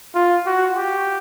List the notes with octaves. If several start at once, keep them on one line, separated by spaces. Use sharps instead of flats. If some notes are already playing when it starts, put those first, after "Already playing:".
F4
F#4
G4